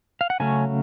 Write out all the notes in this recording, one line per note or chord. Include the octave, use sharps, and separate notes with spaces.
F5
F#5
C#3 F#3 A3 C#4 G#5